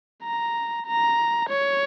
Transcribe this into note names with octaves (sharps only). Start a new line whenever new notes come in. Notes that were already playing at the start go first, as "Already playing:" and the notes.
A#5
A#5
C#5